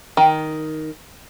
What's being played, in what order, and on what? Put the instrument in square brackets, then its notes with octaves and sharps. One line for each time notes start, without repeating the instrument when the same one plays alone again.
[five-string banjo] D#3